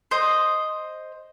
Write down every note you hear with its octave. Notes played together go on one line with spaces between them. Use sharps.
C5 D#5